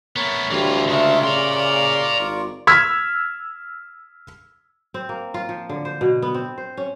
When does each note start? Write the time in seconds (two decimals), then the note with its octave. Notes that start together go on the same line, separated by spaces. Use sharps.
0.16 A3 B3 A#4 C#5
0.51 D2 E3 G3 F4
0.89 C#3 G#3 F4 A#4 E5 C#6
1.24 C#3 D5 A#5 C6
2.19 G#1
2.67 E6 F6 G#6 B6
4.94 C4
5.09 A#3
5.34 F4
5.49 F3
5.69 D3
5.85 C5
6.01 B2
6.22 B3
6.34 C4
6.58 C5
6.77 C#4